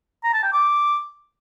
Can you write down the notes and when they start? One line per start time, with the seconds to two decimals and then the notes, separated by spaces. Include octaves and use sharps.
0.24 A#5
0.34 A5
0.43 G5
0.53 D6